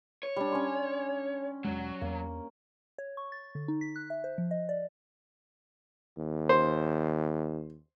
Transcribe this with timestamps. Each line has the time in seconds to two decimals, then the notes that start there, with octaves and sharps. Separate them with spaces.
0.23 C#5
0.36 G3 D4
0.52 C#4 G#5 C6
1.64 E1 C2 F#3 G#3
2.02 E2 A#3
2.98 C#5
3.17 C#6
3.32 A6
3.55 D3
3.68 D#4
3.81 B6
3.96 F#6
4.10 E5
4.24 C5
4.38 F3
4.51 D#5
4.69 D5
6.17 D#2
6.49 C5